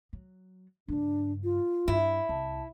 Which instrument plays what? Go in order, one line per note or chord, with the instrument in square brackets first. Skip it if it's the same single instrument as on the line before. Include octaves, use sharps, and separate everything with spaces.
[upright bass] F#3
[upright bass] G2 C#3 [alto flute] D4
[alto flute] F4
[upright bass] G2 [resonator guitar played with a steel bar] E4
[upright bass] C2 [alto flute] A5